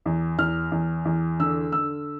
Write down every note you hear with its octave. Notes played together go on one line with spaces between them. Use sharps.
E2
E2 F6
E2
E2
D3 E6
D3 E6